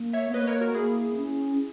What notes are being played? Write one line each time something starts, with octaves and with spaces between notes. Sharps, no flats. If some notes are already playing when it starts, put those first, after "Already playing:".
Already playing: A#3
C#5 E5
B3
A#3 B4 D#5
A#4 C#5
F#4 A#4
A#3 E4 G#4
C#4